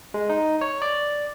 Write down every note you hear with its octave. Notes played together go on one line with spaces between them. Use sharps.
G#3
D#4
C#5
D5